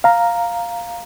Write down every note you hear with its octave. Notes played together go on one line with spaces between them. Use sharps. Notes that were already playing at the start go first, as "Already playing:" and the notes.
F5 A#5